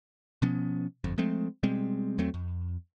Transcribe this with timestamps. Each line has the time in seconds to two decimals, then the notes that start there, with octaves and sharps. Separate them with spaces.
0.42 B2 F3 B3 C#4
1.04 G1 F2
1.18 F3 G#3 A3 C4
1.63 B2 G3 G#3 C4
2.18 E2 F#3 A3 C4
2.34 F2